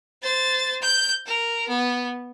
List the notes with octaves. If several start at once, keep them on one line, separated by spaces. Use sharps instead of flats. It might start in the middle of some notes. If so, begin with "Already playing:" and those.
C5 A6
G6
A#4
B3